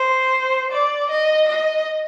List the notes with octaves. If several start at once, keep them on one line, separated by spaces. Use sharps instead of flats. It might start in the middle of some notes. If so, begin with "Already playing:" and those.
Already playing: C5
D5
D#5
D#5